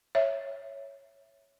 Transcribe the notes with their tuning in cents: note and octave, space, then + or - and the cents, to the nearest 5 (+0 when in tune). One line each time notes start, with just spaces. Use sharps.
C#5 +0 E5 +0